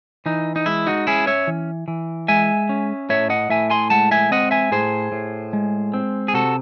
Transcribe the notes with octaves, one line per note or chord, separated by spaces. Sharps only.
E3 D#4
D#4
G#3 E4
D#4 F#4
C#4 E4 G#4
C#5 E5
E3
E3
G#3 E5 G#5
C#4
A2 C#5 E5
D#5 F#5
A2 E5 G#5
G#5 C6
G#3 F#5 A5
E5 G#5
C4 D#5 F#5
E5 G#5
A2 G#4 C5
A2
G#3
C4
G#4
C3 F#4 A4